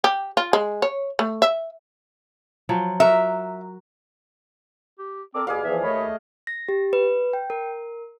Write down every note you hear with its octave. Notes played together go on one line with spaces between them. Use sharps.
G4
F4
G#3
C#5
A3
E5
F3 F#3
F#4 A#4 E5
G4
C4 A4 A#4 D6
D#2 B2 G3 B3 G4 G#4 D5 F5
E2 E3 F3 E5
D#2 A3 C#5 D#5 B5
A#6
G4
B4
G5
A#4